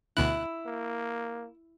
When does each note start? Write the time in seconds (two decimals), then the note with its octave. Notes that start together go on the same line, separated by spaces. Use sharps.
0.17 D2 B2 E4 F#6
0.66 A#3